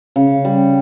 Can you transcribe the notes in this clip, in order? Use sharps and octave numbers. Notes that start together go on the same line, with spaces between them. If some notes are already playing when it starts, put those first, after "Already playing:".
C#3
G3